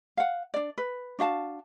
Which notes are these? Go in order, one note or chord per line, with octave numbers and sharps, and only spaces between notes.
F5 F#5
D4 D5
B4
D4 F#4 F5 A5